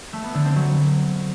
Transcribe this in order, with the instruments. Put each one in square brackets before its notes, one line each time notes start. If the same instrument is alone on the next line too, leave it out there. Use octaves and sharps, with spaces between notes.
[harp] A3
B3
D3
C4
F#3